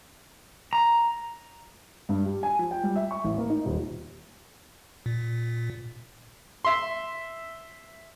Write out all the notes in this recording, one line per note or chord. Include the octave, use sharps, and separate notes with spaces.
A#5
G2
G4
G#5
F3
G5
G3
E5
C#6
A1
A#3
D#4
D#1
A#2
E5 C6